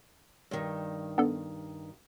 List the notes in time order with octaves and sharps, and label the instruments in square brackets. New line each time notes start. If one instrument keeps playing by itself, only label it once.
[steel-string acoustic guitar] G2 D#3
[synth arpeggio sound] B3 D4 A4